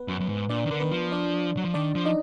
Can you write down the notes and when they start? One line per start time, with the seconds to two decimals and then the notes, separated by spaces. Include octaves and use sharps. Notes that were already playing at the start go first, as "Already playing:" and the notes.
Already playing: B3 B4
0.08 F#2
0.21 F#2
0.29 G#2
0.49 A#2 D4 D5
0.65 D#3
0.71 D3 A#4
0.80 D#3 B3 B4
0.91 F3
1.12 D4 D5
1.57 F#3
1.65 F3
1.74 D#3 D4 D5
1.95 F3
2.05 D#4 D#5